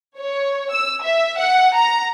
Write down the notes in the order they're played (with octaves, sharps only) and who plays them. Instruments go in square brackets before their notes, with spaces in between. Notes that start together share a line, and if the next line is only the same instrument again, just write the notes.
[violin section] C#5
E6
E5
F#5
A#5